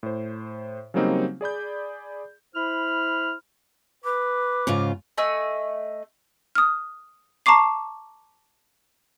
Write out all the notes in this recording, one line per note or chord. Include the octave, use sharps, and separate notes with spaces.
A2 C5
C#3 F#3 G3 A#3 C4 D#4
G#4 D5 B5 G6
E4 C5 B5 F6
B4 D6
G#2 C#3 F4
A3 D#5 G#5 E6
D#6 F6
A5 A#5 C#6 D6 C7